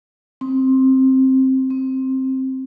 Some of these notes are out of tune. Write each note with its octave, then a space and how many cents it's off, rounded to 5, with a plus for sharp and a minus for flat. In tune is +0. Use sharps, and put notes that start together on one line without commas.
C4 +10
C4 +10